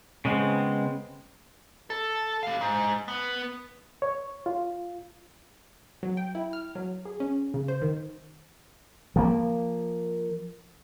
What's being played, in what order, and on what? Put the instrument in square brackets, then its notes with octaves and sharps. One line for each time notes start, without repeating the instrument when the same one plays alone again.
[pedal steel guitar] C#3 G#3 B3 C4
[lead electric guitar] A4
G4 F5
G#2
B3
[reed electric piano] C#5
F4
[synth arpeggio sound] F#3
G5
E4
F6
F#3
G#4
C#4
C#3
C5
D#3
[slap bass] F3 A#3